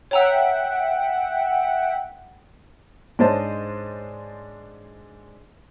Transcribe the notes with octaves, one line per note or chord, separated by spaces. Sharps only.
C#5 E5 F#5 G5 A#5 E6
G#2 D4 C5 C#5 D#5 A5